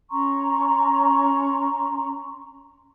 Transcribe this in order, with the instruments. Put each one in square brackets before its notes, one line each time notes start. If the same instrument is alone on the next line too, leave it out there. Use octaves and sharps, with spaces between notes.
[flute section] C#4 A#5 C6 C#6